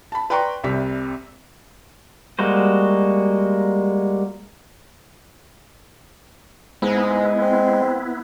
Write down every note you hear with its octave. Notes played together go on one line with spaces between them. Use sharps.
A5 B5
B4 D5 G5 A#5 C6 C#6
C2 C3 G3 B6
G3 G#3 A#3 F#4 C5
G#2 G#3 B3 E4
C4